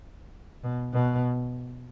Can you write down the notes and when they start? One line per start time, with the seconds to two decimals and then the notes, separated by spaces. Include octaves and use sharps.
0.64 B2
0.93 B2